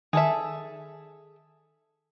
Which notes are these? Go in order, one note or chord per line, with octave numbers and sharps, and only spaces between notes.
D#3 G#4 A4 E5